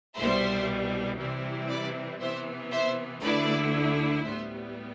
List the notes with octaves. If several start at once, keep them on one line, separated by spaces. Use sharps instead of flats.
C2 B2 G3 C5 E5
C3 E3 G3 C4 E4
B4 D5
C3 E3 B3 C5 E5
C5 E5
D2 D3 A3 E4 B4 D5
A2 G3 B3 C5 E5